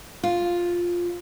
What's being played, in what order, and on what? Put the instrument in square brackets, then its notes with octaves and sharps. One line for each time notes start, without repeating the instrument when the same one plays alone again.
[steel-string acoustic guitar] F4